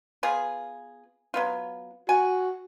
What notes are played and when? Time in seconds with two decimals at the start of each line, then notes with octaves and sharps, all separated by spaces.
0.23 B3 F4 G#4
1.34 F#3 B3 F4
2.09 F#4 G#5